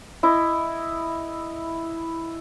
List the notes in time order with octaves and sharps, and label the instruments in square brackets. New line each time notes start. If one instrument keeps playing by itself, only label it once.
[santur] E4 D#5